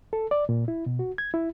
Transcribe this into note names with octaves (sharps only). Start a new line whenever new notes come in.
A4
D5
A#2
E4
B2
F#4
G#6
E4